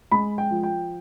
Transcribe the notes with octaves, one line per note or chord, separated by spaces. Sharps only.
G#3 B5
G5
F3
G5